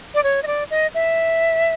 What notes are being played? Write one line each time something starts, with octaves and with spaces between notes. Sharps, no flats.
D5
C#5
D#5
D5
D#5
E5